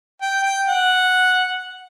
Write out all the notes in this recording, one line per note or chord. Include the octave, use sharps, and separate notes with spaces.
G5
G5
F#5